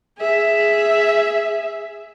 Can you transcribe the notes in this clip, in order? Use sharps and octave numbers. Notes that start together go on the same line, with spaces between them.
G#4 E5